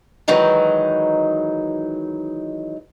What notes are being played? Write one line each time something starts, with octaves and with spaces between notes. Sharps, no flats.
D#3 E3 F#3 G#3 D#4